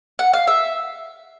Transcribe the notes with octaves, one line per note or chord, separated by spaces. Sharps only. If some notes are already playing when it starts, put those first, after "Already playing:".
F#5
F5
E5